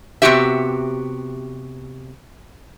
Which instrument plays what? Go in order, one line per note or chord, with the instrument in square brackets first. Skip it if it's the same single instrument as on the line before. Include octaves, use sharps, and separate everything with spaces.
[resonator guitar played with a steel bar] C3 D#3 B3 F#4 G4 E5